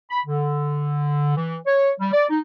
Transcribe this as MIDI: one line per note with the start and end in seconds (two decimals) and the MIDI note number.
0.11 0.20 83
0.26 1.35 50
1.37 1.56 52
1.67 1.90 73
2.00 2.10 55
2.13 2.26 74
2.30 2.39 63